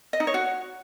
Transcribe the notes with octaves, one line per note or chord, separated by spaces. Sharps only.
D#5
D#4
C#5
F#4